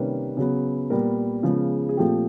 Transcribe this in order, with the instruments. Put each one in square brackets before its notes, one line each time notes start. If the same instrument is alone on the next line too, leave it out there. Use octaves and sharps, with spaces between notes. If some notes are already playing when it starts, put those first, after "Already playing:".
Already playing: [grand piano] C3 D#3 G3 A#3 C#4 B4
C#3 F#3 B3
A#2 G3 B3 A#4
C#3 F3 G#3 B3
G#4
A#2 F3 A3 C4 G4